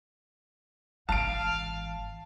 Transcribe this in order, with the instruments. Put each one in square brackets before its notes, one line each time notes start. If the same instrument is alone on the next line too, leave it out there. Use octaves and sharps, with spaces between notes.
[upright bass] G#1 E3 [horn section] F5 [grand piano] A5 D7